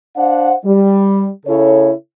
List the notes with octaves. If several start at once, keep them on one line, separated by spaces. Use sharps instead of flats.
D4 C5 F5 F#5
G3
C#3 E4 A4 C#5